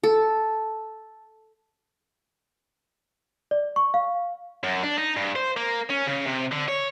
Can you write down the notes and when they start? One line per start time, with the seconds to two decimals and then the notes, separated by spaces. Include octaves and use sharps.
0.03 A4
3.51 D5
3.76 C#6
3.94 F5
4.63 F#2
4.83 D4
4.98 D#4
5.16 G2
5.36 C5
5.57 A#3
5.89 C#4
6.07 C#3
6.26 C3
6.52 D3
6.68 C#5